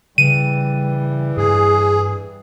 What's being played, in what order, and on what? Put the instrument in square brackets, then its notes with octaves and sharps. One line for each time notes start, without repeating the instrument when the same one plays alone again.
[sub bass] C#3 [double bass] E3 G3 [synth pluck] D#7
[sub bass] G2 [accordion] G#4